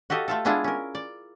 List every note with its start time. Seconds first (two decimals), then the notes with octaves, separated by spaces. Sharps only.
0.10 F#4 G4 A4 D#5 F5
0.28 A3 F4 A4
0.45 G#3 B3 D4 E4 F4 G#4
0.64 C#4 A#4
0.95 D5